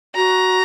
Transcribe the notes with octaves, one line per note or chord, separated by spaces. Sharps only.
F#4 A#5